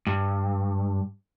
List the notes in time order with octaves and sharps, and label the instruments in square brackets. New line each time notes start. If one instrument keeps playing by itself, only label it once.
[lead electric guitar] G2